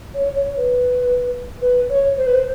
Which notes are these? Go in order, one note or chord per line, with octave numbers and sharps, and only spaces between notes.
C#5
C#5
B4
B4
C#5
C5
B4
C5